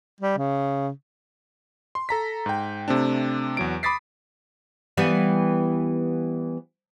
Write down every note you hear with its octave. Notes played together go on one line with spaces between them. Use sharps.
G3
C#3
C6
A4 A#5 B6
G#2 G5
C3 A3 C4 D4
E2 F#3 D7
B5 D6 D#6 A6 B6 C7
E3 G3 B3